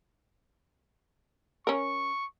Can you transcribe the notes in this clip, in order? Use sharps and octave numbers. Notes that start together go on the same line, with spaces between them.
C#4 A#4 C#6